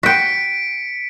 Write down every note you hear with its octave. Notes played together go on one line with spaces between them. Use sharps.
F#4 G5 B6 C#7 D7